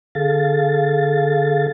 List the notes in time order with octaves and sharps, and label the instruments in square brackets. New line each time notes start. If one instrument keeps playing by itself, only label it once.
[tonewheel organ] D3 G#4 A4 F5 A6